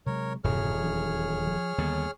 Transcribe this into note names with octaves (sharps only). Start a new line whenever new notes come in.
C3 F#3 G#3 A#4 C#5
D#1 E2 G2 C3 G#4 C#5 F6
E3 F#3 D4
F3
D#2 D3 G3 B3